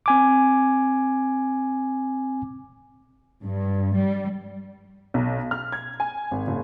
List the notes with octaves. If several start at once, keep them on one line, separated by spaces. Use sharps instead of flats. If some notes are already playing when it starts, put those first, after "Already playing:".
C4 G#5 D6
G2
G3
B1
F6
G#6
G#5
G#1
F#1